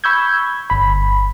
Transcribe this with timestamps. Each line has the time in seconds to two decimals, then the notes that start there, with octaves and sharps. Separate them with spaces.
0.04 B5 C#6 E6 G6 G#6
0.70 G1 B5